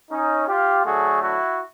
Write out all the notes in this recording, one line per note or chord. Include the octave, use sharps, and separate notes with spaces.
C#4 D#4
F4 G4
D3 F#3 A3 F#4 G#4
E4 F#4